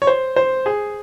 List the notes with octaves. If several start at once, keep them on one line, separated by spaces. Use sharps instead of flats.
C#5
C5
C5
G#4